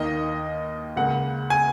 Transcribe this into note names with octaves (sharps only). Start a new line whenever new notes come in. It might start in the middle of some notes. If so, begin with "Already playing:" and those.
Already playing: D#2 D#3 A#3 D#5
C#2 C#3 A#3 F#5
G#5